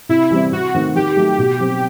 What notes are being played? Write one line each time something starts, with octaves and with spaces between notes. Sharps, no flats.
C3 E4
E3 G3 C4
C3 F#4
D#3 A3 C4
D#3 G4
F#3 A3
B2
F#3 C4